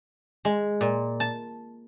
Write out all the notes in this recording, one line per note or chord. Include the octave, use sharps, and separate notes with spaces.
G#3
A#2
A5